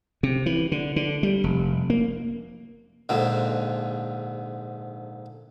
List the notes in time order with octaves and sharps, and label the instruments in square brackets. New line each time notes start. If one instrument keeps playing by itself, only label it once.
[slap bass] C3
E3
D3
D3
G3
F1
A#3
[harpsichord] A#1 G#2 D3